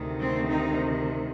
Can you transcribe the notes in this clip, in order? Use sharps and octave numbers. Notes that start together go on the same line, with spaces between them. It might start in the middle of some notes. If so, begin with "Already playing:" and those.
Already playing: D2 C3 D#3
A3 C4
C4 D#4